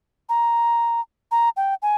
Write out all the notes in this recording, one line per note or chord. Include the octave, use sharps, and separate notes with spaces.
A#5
A#5
G5
G#5